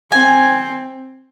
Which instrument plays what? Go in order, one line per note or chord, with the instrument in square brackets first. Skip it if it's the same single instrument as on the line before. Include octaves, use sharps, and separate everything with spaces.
[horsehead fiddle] C4 [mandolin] G#5